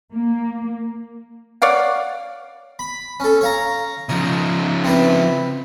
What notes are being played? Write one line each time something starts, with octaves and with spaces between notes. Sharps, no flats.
A#3
C#5 D5 F5 F#5
B5
C#4 A4
C#5 F5 A#5
C#3 F3 D#4
C4 E4 B4